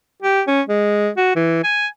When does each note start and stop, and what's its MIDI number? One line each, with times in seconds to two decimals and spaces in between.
0.22 0.42 67
0.47 0.62 61
0.69 1.09 56
1.17 1.36 66
1.36 1.62 52
1.64 1.87 80